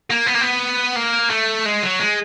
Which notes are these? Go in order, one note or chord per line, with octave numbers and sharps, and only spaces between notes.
A#3
B3
A#3
B3
A#3
A3
G#3
F#3
G#3